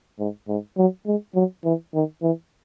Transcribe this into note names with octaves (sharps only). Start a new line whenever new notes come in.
G#2
G#2
F#3
G#3
F#3
E3
D#3
E3